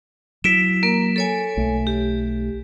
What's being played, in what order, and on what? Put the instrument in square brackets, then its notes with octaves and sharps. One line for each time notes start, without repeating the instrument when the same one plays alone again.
[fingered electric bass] F#3 [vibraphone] E4 [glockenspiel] B6 D7 E7
[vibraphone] A#3 A#4
A4 C#5 G#5
[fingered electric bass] B1 A3
[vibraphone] G4